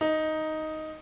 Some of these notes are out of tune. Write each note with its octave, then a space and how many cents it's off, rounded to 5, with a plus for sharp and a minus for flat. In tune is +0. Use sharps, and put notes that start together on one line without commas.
D#4 +5